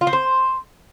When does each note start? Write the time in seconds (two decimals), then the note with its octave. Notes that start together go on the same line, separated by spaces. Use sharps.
0.01 F4
0.07 C4
0.13 C5